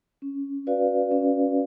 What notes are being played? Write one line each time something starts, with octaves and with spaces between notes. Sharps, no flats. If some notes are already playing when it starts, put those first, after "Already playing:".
C#4
F#4 B4 D5 F5
C#4